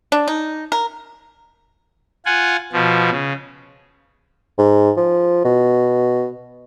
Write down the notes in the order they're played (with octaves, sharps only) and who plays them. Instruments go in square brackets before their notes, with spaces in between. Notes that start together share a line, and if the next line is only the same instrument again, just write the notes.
[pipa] D4
D#4
A#4
[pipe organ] F4 F#5 G#5
B2 F3
C#3
[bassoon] G#2
F3
B2